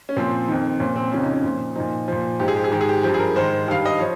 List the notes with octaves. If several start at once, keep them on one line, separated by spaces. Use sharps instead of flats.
C#4
A#2 F3 C4
F2 D#3
A#2 F3 C#4
C4
F2 C#3 F3 C#4
D#4
C#4
A#2 F3
A#2 F3 D#4
A#2 F3
G#2 F3 G4
G#4
G4
G#4
G#2 D#3 G4
G#4
G4
G2 F3 G4
G#4
A#4
G#2 D#3 C5
G2 D#3 F5
D#5
F3 C#5